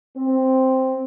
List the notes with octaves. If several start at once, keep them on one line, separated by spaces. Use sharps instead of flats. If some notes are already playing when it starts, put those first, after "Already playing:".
C4